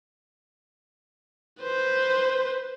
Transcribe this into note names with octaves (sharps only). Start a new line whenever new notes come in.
B4 C5